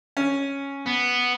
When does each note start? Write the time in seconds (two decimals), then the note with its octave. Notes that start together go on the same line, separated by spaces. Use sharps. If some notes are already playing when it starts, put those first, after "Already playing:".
0.17 C#4
0.87 B3